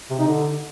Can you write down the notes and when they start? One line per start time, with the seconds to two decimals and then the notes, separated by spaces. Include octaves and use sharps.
0.10 C3
0.19 D#4
0.27 D3